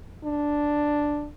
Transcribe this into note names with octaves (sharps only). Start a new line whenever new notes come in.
D4